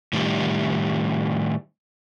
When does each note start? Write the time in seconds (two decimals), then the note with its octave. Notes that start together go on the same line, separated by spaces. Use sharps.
0.13 A2 D#3 G3